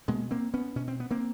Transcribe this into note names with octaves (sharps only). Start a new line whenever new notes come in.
B2 G#3 A#3
A#3 C4
B3 C#4
B2 C#4
C4
B3
A#3 C4